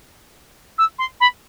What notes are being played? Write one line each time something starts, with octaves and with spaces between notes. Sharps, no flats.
E6
C6
B5